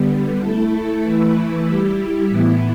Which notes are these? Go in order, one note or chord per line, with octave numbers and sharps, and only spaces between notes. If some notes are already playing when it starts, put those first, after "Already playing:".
Already playing: D3 G3 B3
A3 E4 A4
E3 A3 E4 B4
G3 E4 G4
A2 E3 B3 E4